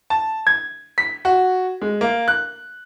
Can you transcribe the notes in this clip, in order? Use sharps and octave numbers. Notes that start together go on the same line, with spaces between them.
A5
G#6
B6
F#4
G#3
A#3
F#6